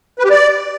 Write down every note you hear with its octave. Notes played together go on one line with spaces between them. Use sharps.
B4
G4
D5